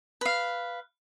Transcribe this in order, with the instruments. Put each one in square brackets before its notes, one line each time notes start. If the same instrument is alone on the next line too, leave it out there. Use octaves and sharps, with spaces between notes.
[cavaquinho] B4 F5